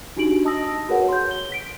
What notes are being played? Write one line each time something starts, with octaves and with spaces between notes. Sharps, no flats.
D4 D#4 F#4 G4 D7 F#7
D#5 A5 D#6 E6 A#6
F#4 G#4 A#4 B4 C#5 F#5
C6 G6
G7
B6 D7